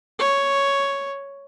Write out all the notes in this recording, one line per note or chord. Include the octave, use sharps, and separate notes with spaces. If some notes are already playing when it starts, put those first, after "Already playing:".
C#5